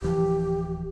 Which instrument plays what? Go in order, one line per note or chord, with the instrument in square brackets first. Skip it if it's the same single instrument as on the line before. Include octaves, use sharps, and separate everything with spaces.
[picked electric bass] D1 E3 F3 [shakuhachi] G4